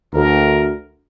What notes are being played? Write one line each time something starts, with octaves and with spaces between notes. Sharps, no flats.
D2 A#4